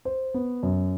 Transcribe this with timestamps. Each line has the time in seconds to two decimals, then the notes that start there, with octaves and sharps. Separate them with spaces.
0.05 C5
0.34 B3
0.63 F#2